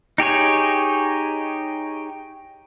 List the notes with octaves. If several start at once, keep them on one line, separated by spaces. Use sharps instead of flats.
D#4 G4 G#4 C#5